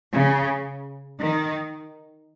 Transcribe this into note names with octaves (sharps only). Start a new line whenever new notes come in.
C#3
D#3